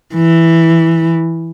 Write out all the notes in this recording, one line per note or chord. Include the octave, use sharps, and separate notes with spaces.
E3